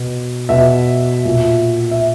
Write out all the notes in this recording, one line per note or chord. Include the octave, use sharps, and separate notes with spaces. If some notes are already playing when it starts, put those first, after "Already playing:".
Already playing: B2
B2 E5
A#2
E5